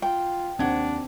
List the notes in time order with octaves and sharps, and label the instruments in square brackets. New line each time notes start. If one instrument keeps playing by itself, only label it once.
[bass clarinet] F4 [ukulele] G5
[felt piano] D#2 F#5 G#6 [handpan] C4 [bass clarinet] D4